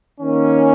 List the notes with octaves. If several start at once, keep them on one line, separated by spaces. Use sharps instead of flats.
D#3 A#3 C#4